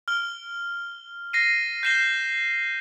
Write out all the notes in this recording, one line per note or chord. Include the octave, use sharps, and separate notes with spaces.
F6 G7
A#6 C7 D#7
G6 A#6 C7 E7 G7